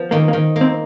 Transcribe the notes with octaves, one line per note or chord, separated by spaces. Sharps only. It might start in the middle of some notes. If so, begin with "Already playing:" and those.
Already playing: F3 B3
D#3 A#3
A#3
D#3
A#3
C4